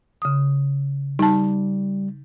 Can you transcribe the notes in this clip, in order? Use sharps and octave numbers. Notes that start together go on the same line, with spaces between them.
C#3 D#6
G3 D#4 A5